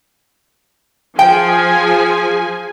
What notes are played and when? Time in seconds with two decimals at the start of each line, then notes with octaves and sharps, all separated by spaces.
1.19 F3 G#4 G5 G#5